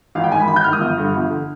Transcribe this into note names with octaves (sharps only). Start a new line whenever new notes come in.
G#1 F5
G5
G#2 D#3 G#5 B5
G#1 B5
G6
G#2 D#3 F6
D#6
G1
G2 D3
G1
D3